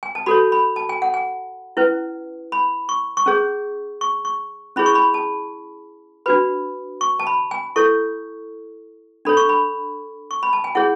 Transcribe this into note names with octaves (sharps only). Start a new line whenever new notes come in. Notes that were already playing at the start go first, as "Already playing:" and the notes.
G#5
A5
F#4 A4 C#5 B5
B5
A5
G#5
F#5
G#5
C#4 E4 B4
B5
C#6
C#6
C#4 G#4 C#5
C#6
C#6
C#4 E4 G#4 C#5 B5
C#6
B5
A5
D4 F#4 B4 B5
C#6
A5
B5
G#5
E4 A4 C#5 C#6
D4 A4 C#5 B5
C#6
B5
C#6
B5
A5
G#5
E4 G#4 C#5 F#5